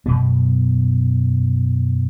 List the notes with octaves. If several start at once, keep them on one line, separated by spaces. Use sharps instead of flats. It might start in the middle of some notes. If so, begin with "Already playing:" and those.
F#2 B2 B3